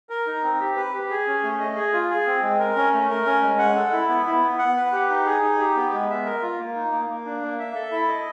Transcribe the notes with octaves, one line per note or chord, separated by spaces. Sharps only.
A#4
D#4
C4
G4
B4
G4
G#4
C#4
A3
D#5
G#4
F4
G#4
C4
G#3
A#4
C#4
A3
A#4
C#4
G#3
F#5
A4
E4
B3
E4
B3
F#5
B4
G4
D#4
G#4
D#4
G4
B3
G#3
E5
A#4
F4
A#3
D#4
A#3
A#3
D4
A#3
E5
A4
E4
D#5